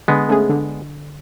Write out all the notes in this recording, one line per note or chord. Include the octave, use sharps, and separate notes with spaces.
D3 G#3 B3
A3 C#4 G#4
D3